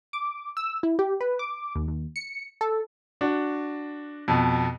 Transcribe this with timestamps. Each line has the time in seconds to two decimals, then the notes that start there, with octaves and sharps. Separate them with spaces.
0.13 D6
0.57 E6
0.83 E4
0.99 G4
1.21 B4
1.39 D6
1.75 D#2
1.88 D#2
2.16 C#7
2.61 A4
3.21 D4 F#4
4.28 F2 B2